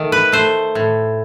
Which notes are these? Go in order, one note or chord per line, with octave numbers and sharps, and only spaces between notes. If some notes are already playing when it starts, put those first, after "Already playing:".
Already playing: D#3 A3
B4
A3 C5
A2